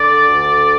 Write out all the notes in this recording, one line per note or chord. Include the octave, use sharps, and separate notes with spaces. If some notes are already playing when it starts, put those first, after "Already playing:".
Already playing: D3 D5
D2